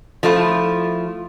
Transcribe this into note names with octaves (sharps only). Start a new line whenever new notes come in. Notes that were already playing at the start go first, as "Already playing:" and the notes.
F3 A3 E4 F4